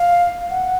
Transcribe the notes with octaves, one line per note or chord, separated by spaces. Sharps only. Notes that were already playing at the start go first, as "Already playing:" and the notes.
Already playing: F5
F#5